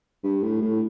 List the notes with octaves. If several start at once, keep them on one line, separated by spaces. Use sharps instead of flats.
G2
A2
A2